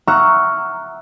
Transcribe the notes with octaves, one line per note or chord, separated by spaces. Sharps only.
E5 F#5 A#5 C#6 E6 F6